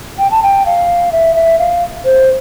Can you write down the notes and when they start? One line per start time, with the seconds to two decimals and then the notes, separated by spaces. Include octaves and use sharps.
0.19 G5
0.31 A5
0.43 G5
0.66 F5
1.12 E5
1.36 E5
1.59 F5
2.05 C5